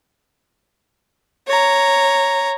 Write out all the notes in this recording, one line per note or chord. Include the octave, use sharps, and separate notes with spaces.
C#5 A#5